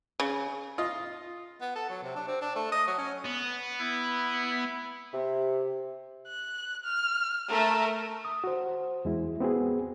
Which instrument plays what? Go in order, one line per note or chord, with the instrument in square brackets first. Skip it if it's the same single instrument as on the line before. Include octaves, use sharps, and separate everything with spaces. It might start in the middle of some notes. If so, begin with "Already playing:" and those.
[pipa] C#3
[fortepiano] F4 D#5
[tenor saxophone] B3
A4
F#3
C3
D4
C4
D4
A3
D#5
F#3
C#4
[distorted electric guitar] B3
[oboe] E4
[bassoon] C3 [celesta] G4
[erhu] F#6
F6
[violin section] A3 [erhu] A#4
[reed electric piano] D#6
F#4 C5
E2 G#3 E4
B3 C4 F#4 G#4